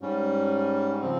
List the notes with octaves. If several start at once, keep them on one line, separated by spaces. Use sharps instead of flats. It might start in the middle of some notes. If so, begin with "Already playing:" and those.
G#2 G3 C#4
C#3 F3 C4